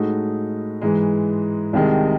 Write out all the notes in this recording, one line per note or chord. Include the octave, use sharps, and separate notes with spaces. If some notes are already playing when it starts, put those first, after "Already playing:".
Already playing: A2 G#3 D#4 F#4 A4
G#2 E3 G#3
C2 C3 D#3 G#3